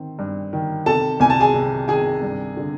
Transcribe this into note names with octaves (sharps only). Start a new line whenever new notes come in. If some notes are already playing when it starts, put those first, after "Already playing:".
Already playing: D#3 C4
G2
D#3
C3 A4 A5
C2 G#5
A5
G#4 G#5
C3
D#3 G#4 G#5
G2
D3